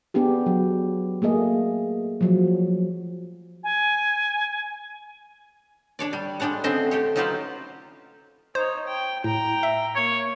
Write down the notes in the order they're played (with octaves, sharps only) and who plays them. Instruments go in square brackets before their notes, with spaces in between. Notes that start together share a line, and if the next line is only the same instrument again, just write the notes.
[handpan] B3 D4 G4 G#4
F#3
A3 A#3 G#4 D#5
F3 F#3
[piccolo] G#5
[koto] D4 C#5 D5
G3
G3 G#3 D4 C#5 F#5
D3 C4 C#4 D#5 E5
A3 G4 C#5
F#3 D#4 F4 G4 B4 C5
[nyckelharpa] D#4 C#5 [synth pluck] C5
[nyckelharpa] G5
[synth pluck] A2 [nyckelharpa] G5 A#5
[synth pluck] E5
[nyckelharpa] A#3 [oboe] C#5